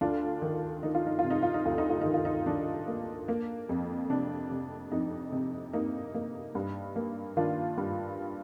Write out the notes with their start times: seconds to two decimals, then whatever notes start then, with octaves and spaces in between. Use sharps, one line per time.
0.01 D2 D4 F4
0.42 D#3
0.83 D#3 D#4
0.95 F4
1.07 D#4
1.19 F4
1.24 C3
1.30 D#4
1.43 F4
1.54 D#4
1.65 D2 F4
1.78 D#4
1.90 F4
2.01 D#3 D#4
2.14 F4
2.25 D#4
2.46 D#3 D4
2.88 A#3
3.28 A#3
3.69 F2
4.10 C3 D4
4.51 C3
4.92 F2 D#4
5.32 C3
5.73 A#3 D#4
6.14 A#3
6.55 G2
6.96 A#3
7.37 D#3 D4 F4
7.78 G2